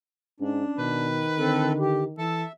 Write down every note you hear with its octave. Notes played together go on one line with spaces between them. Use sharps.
G#2 C#4 D4
B2 D#3 B4
D3 C4 A4
G4
E3 A4 E5